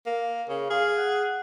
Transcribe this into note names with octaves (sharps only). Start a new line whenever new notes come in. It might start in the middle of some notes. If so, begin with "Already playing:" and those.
A#3
C#3
G#4 F5
F#5